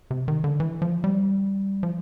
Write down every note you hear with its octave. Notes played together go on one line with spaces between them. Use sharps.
C3
D#3
D3
E3
F3
G3
F3